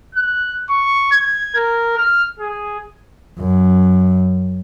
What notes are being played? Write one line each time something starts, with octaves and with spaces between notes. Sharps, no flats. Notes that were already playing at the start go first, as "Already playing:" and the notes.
F#6
C#6
G#6
A#4
F6
G#4
F#2